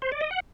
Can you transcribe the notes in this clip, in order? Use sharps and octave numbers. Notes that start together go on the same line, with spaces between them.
C5
D5
D#5
F#5